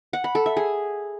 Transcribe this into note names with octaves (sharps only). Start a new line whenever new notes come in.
F#5
B5
A4
E5
G#4